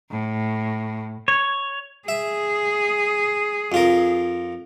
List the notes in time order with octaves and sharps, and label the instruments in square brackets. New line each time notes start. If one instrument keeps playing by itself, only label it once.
[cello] A2
[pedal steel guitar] C#5
[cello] G#4 [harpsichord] E5
[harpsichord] F2 F4 A#4